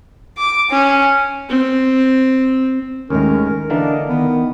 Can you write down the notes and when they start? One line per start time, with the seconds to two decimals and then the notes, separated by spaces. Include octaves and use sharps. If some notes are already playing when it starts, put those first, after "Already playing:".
0.38 D6
0.71 C#4
1.49 C4
3.10 D#2 A2 D#3 G#3 C#4 A#4
3.51 A#4
3.70 D3 E3 A#3 D4 D#5
4.09 D#3 B3